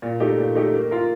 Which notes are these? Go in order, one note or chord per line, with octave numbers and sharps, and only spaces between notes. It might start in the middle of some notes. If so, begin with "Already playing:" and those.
A#2
A3 D#4 G4
A#2
A3 D#4 G4
A#3
F4 A#4